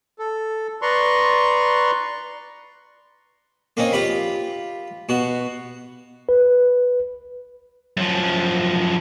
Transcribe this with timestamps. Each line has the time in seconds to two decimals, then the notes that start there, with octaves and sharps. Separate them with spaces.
0.19 A4
0.82 B4 D5 A#5 C6 C#6
3.77 A#3 C4 C#4 D#4
3.93 F4 G4 B5
5.09 B2 F#4
6.29 B4
7.97 F#2 F3